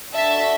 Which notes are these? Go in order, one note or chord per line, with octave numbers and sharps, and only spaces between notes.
D4 F#4 A4 E5 A5